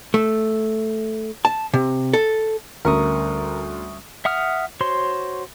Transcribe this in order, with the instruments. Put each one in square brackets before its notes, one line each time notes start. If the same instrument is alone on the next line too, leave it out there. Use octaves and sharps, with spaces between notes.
[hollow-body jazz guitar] A3
A5
C3
A4
[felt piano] D2 [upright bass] G3 C#4 [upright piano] A#4 [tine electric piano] E5 C#6 D#6
[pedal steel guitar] E5 F#5 D#6 F6
F#4 C5 C#5 C6